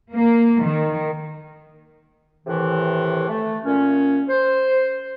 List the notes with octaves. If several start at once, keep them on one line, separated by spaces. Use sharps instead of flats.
A#3
D#3
A2 C3 D#3 E3
A3
A#2 C#4
C5